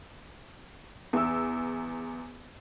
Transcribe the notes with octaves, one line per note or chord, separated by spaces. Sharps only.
E2 E6